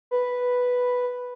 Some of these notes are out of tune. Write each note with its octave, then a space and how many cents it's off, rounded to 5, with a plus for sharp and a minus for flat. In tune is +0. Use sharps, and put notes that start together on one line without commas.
B4 +0